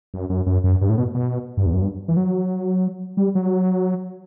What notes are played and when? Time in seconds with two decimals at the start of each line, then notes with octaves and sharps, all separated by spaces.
0.14 F#2
0.29 F#2
0.46 F#2
0.64 F#2
0.81 G2
0.89 A2
0.98 B2
1.14 B2
1.57 G2
1.66 E2
1.73 F#2
1.82 G2
2.08 E3
2.17 F#3
3.17 G3
3.35 F#3